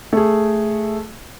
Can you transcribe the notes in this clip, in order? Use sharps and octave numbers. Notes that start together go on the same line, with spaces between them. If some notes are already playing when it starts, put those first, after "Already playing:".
A3 G#4